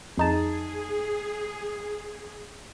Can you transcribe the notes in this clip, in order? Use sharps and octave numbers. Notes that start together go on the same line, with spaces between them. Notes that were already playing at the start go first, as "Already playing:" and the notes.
F2 D#4 G#4 A5